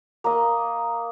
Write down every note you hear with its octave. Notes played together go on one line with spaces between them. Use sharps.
A#3 D#5